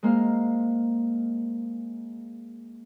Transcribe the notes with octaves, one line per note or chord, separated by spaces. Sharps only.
G#3 A#3 C5 F5